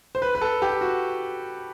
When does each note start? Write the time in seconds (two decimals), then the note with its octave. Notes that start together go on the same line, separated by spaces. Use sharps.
0.15 C5
0.22 B4
0.35 B4
0.41 A4
0.62 G4
0.81 F#4